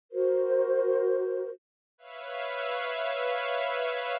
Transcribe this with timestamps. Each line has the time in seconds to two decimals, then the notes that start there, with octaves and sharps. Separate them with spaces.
0.12 F#4 A#4 C5
1.98 B4 C#5 E5 F5